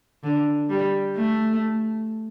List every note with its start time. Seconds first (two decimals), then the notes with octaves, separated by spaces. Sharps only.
0.24 D3
0.70 G3
1.16 A3